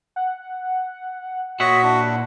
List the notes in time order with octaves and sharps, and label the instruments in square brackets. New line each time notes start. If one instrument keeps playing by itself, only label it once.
[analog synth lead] F#5
[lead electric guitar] A#2 F#5 [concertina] F#4 [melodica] C#5 D#5 E5 [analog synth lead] B6
[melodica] D4 E4